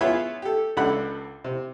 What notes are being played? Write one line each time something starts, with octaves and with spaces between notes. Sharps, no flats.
B3 F4 G#4 C#5 E5
G4 A4
C#2 D4 A4 F#5 B5
C3